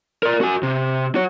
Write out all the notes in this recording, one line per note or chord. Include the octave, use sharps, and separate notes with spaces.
A#4 D5
F#4 G#5
C3
F#4 C#5